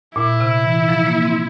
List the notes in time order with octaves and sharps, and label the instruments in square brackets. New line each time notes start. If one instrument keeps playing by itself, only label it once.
[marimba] A#2 [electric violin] E4
[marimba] C3
E3
F3
A#3
C4